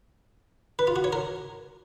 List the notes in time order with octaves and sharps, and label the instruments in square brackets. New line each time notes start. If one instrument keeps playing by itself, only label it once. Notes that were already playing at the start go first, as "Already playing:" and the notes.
[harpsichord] B4
F4
F#4
C#5
A#4